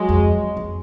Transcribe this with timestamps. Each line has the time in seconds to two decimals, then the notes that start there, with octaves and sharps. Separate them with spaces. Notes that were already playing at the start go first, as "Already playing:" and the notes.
Already playing: F#3 G#3
0.09 F2
0.57 F2